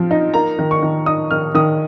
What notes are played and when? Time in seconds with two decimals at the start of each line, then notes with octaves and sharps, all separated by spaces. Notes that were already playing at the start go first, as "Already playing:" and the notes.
Already playing: F3 C4
0.11 D#4
0.34 A#3 A#5
0.59 D#3
0.71 C#6
0.83 D#3
1.06 D#4 D#6
1.31 D#3 F6
1.55 D#3 D#6